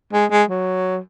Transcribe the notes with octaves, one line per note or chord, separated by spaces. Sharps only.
G#3
G#3
F#3